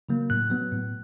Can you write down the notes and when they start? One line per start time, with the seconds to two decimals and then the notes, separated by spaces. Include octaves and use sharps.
0.09 C#3 F#3 A#3
0.30 A2 F#6
0.50 F#3 B3
0.72 A2